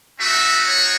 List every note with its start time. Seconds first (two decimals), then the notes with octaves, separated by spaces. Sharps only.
0.20 A3 C4 D#4 F#4 E5
0.66 C#5